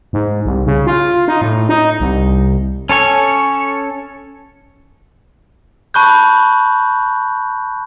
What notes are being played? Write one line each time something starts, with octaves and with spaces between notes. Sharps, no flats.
G#2
C2
C#3
F4
D#4
A2
D#4
C2
C#4 A4 C#5 G#5
A5 B5 C#6 F#6 G6